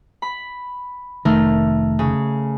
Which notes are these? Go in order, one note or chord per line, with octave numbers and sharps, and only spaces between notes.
B5
F1 D#3 A3 A#4
C#3